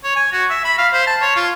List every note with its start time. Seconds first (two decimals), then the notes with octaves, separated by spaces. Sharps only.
0.04 C#5
0.16 G#5
0.32 F#4
0.50 E5
0.65 B5
0.78 F5
0.93 C5
1.07 A5
1.22 C#5
1.36 F4